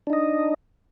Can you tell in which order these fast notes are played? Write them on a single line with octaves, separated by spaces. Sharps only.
D4 D#4 D#5